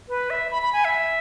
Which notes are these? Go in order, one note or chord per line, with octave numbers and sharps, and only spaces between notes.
B4
E5
B5
B5
G#5
E5